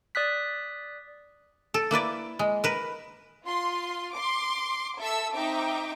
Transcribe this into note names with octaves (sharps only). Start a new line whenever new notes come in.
D5 D#6 F#6 B6
A4
A#3 E4 B4 D5
G#3
A#4 B4
F4 C6
C6 D6
A4 E5 E6
C4 D#4 E5 G5 D6